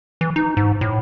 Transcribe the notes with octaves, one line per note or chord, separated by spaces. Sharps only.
E3
D#4
G#2
A2